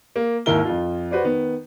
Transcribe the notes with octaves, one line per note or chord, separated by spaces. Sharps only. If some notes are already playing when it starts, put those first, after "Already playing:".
A#3
G#1 D#2 E4 A#4 G7
F2 F4
F#4 B4 C5 D5
D#3 B3